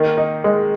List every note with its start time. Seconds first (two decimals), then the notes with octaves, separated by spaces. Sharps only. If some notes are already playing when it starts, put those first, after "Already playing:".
Already playing: D#3 A#3
0.17 D#4
0.44 G#3